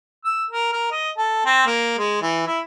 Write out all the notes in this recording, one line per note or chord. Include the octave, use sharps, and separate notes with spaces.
E6
A#4
A#4
D#5
A4
C4
A#3
G#3
E3
E4